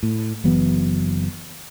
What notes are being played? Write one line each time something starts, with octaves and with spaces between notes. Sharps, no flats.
A2
F#1 E3 F#3 B3